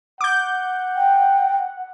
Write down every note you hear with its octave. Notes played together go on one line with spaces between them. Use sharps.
F#5 D6 G6
G5